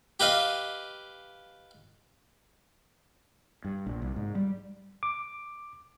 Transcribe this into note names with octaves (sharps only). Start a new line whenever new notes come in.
G4 B4 D#5 F5
G2
A#1
C2
G#2
G3
D6